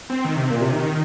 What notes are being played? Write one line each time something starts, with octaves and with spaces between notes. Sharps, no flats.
C4
D#3
C3
A#2
C3
D#3